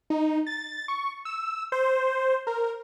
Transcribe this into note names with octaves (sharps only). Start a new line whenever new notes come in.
D#4
A6
C#6
E6
C5
A#4